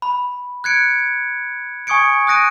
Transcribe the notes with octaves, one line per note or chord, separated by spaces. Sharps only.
B5
F#6 G#6 C#7 D7
G#5 C#6 D#6 G#6 C#7 D7
D#6 F#6 A#6 D7 D#7